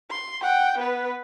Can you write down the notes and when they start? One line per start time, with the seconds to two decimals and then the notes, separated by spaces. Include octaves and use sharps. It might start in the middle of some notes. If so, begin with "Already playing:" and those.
0.11 C6
0.42 F#5 G5
0.78 B3 B4